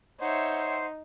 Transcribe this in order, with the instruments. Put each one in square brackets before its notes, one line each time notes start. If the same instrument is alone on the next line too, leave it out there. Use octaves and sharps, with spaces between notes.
[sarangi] D#4 [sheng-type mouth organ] C5 C6 [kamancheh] C#5 E5 [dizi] F#5